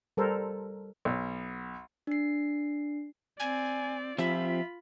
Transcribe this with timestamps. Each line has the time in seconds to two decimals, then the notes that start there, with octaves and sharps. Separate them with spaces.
0.17 G3 A4 A#4 C5
1.05 B1
2.07 D4 C7
3.40 C4 D5 G#5
4.18 F3 C4 F4 G4 E5 B5